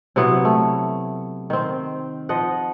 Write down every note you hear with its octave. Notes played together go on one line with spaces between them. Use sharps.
C3 F#3 B3 E4
A3
D#3 C4
F3 D#5 F#5